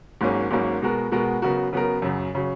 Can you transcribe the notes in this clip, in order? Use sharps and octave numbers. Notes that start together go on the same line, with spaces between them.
G#1 G#2 F#3 A#3 C#4
G#1 G#2 F#3 A#3 C#4
B2 G#3 B3 F#4 A#4
B2 G#3 B3 F#4 A#4
C#3 F#3 B3 F#4 A#4
C#3 F#3 B3 F#4 A#4
F#2 C#3 F#3
C#3 F#3